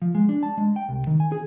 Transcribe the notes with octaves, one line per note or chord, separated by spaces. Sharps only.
F3
G#3
D4
A5
G#3
G5
C2
D#3
G#5
G#4